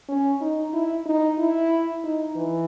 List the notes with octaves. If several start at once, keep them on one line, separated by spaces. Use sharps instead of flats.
C#4
D#4
E4
D#4
E4
D#4
E3